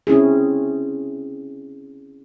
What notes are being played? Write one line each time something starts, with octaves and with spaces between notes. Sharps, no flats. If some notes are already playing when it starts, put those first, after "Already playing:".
C4 C#4 E4 G#4